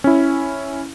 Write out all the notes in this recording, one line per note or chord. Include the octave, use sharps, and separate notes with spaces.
C#4 E4